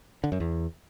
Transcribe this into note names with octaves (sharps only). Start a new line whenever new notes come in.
D3
F#2
E2